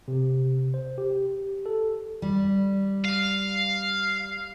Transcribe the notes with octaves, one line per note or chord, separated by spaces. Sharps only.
C3
C5
G4
A4
G3
F5